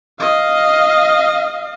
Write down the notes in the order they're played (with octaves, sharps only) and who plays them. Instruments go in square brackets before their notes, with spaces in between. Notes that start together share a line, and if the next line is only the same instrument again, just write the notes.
[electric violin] D#5 F5